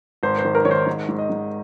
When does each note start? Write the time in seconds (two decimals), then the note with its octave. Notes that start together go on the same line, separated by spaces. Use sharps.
0.23 G#1 C5
0.38 C5
0.45 D#3
0.55 A#4
0.65 D#3 C#5
0.71 C5
0.86 G#2
1.09 G#2
1.19 D#5
1.30 G#2